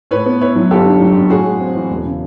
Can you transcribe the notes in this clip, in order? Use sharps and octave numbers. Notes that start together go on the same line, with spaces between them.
A2 B4 C#5
B3
E4 B4 C#5
F#3
G1 G4 A4
D3
F#3
F#2
A2 F#4 G#4
G#3
C4
E3
E1
C#3